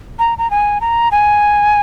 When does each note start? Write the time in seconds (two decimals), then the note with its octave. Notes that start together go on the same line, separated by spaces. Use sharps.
0.19 A#5
0.38 A#5
0.51 G#5
0.81 A#5
1.12 G#5